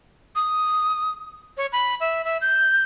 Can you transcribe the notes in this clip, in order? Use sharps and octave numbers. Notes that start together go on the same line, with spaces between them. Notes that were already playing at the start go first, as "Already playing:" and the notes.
D#6
C#5
B5
E5
E5
G6